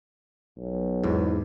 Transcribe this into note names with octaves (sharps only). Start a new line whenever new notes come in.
B1
E2 G#2